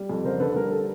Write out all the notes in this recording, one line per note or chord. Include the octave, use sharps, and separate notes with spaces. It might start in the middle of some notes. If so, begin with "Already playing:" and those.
Already playing: G3
F2
F#1 A#4 C5
D3 A4 B4
G3 A#4
A4